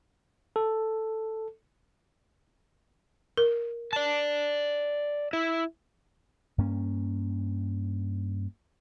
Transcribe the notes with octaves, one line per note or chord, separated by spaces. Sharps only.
A4
A#4
D5 A5
E4
G2 A#3 C#4